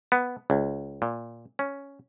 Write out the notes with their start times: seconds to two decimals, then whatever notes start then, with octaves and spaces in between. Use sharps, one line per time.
0.12 B3
0.50 C#2
1.02 A#2
1.59 C#4